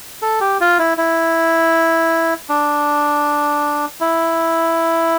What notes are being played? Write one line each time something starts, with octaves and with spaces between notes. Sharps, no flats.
A4
G4
F4
E4
E4
D4
E4